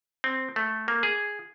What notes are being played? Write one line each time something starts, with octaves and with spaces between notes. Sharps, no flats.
C4
A3
A#3
G#4